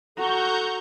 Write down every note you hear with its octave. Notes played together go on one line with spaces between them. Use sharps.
F#4 A4 A#5 C#6 G6